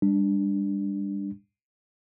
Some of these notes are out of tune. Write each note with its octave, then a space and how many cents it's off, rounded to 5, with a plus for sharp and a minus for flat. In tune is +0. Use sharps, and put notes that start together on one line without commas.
G3 +35 D4 +0